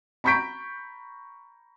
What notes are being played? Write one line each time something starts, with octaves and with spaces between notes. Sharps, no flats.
A#5 B5 C#6 G6 B6 D7